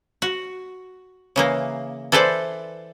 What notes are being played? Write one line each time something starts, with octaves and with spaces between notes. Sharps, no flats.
F#4
C#3 E3 A#3
E3 A4 B4 C5 D5